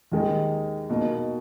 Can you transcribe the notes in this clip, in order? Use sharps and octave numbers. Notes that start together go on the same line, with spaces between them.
D#2 D#3 G#3 D#4
B2 A#3 D#4